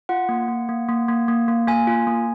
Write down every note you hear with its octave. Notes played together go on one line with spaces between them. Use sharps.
F4 F#5
A#3
A#3
A#3
A#3
A#3
A#3
A#3
A#3 G#5
F4
A#3